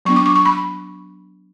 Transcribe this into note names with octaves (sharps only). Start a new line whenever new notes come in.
F#3 B3 D4 C#6
D6
C#6
C#6
B5